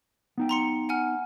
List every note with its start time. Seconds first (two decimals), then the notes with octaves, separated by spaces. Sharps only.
0.38 B3 D#4 G5
0.49 A#5 C6 C#7
0.89 F#5 G#5 F6